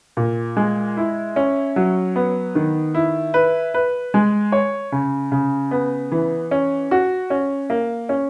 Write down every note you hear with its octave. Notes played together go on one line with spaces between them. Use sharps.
A#2
G#3
E4
C#4
F#3
B3
D#3
E4
B4
B4
G#3
C#5
C#3
C#3
B3
E3
C#4
F#4
C#4
A#3
C#4